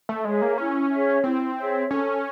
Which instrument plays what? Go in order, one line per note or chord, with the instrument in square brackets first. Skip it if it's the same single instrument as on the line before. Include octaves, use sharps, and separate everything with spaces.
[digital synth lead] A3
[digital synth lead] G#3 [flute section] G#4 C#5 E5
[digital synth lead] A#3
[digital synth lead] C#4 [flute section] E4
[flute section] G#4 C#5 E5
[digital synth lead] C4 [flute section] E4
[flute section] G#4 C#5 E5
[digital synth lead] C#4 [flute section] A4